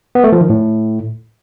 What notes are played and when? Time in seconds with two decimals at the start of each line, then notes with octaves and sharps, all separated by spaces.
0.15 B3
0.24 A3
0.32 F3
0.41 D#3
0.50 A2